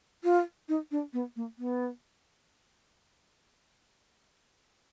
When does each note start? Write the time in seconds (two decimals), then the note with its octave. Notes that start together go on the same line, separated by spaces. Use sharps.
0.24 F4
0.69 D#4
0.91 D4
1.13 B3
1.36 A#3
1.58 B3